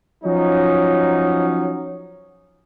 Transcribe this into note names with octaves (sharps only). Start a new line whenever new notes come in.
F3 F#3 C#4 D#4